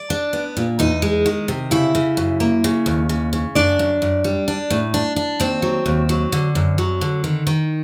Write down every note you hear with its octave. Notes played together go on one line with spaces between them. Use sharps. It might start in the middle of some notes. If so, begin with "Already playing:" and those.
Already playing: D5
D4
B3
A#2
E2 D#4 D#5
G#3
D#3
C3
C#3 E4 E5
C#3
F#2
A#3
C#3
D#2
C#3
C#3
F#2 D4 D5
F#2
F#2
G3
D4
A2
D4
D4
D#2 C4 C5
F#3
D#2
F#3
D3
F#2
F#3
D3
D#3
D#3